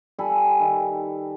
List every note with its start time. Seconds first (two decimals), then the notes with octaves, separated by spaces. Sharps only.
0.19 G3 A4 G#5 B5
0.60 D#3